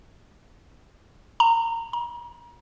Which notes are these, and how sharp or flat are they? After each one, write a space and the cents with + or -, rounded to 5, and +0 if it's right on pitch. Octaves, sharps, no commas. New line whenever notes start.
A#5 -20
A#5 +35